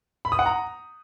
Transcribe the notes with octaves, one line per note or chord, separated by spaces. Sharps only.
B5
D#6
F#5
A#5